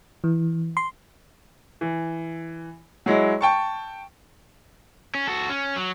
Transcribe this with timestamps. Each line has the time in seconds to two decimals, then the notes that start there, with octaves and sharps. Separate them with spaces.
0.24 E3
0.77 C6
1.81 E3
3.06 F#3 G#3 E4
3.41 G5 A5 C#6
5.15 C#4
5.27 F#4 A4
5.50 C#4
5.76 F#3